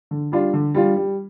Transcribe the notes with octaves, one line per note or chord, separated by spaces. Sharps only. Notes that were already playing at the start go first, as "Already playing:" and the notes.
D3
G3 D4 F4
D3
G3 D4 F4
G3